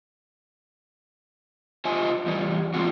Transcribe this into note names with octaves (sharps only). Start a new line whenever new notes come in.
F4 C5 D#5 G#5 A5
E2 E3 G3
D#3 F3 G#3 C4 F4 F#4